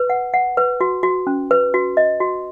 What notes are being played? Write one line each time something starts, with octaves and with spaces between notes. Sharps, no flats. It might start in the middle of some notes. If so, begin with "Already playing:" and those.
Already playing: B4
F#5
F#5
B4
F#4
F#4
C#4
B4
F#4
D#5
F#4